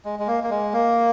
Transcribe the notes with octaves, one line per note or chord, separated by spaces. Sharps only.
G#3
G#3
A#3
A#3
G#3
A#3